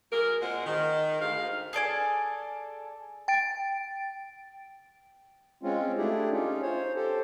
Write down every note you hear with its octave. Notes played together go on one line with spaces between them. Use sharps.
F#3 G#4 A#4
A#2 G#3 C4 G#4 F#5
D#3
D2 G#2 F5
G#4 A4 D5 G#5
G5 A6 D7
G#3 C4 C#4 F4
A3 D4 E4 G4 G#4
C#4 D#4 F4
C5 C#5
G4 A4 C5